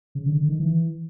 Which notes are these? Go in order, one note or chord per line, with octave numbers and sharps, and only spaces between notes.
C#3
D3
D3
D#3
E3